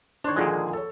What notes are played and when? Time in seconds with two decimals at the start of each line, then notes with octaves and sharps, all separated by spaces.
0.24 D#3 D4 C5 C#5
0.36 A#2 D3 D#3 F3 G#3 G#4
0.73 A4 C#5